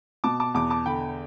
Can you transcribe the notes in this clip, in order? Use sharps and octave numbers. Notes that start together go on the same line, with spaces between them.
B2 A5 D6
A5 D6
E2 A5 D6
A5 D6
D3 G5 B5